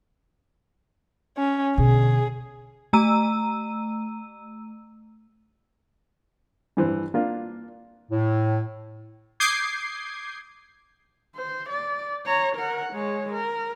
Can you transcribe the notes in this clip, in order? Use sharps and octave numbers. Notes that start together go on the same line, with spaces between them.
C#4
B2 D3 G#4
A3 A#5 E6 D#7
G2 E3 C5
A#3 D4 F4
A2
D6 D#6 G6 G#6 C7
C5
D5
C#5 A#5
A#4 F#5
G#3 C#5
A#4